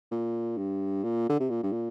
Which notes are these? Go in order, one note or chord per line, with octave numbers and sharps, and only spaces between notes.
A#2
G2
A#2
D3
C3
A#2
G2
A#2